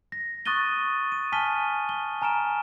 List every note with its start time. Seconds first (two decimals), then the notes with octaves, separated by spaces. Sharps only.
0.12 A#6
0.45 C#6 D#6 F#6 A6 D#7 G7
1.12 D#7
1.32 G#5 A5 F6 B6 D#7 G7
1.89 G7
2.22 G#5 A#5 F6 D7 E7